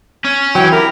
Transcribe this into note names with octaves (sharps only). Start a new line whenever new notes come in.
C#4
E3 F#3 G5
E4 G4 A#4